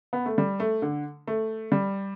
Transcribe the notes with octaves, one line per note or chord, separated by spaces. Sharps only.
B3
A3
G3
A3
D3
A3
G3